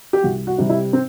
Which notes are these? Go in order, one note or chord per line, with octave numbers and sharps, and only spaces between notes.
G4
C2 F#4
F#4
C3 G3
E4
C4